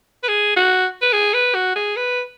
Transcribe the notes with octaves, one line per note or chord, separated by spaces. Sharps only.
B4
G#4
F#4
B4
G#4
B4
F#4
G#4
B4